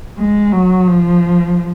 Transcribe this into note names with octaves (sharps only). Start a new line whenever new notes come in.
G#3
F#3
F3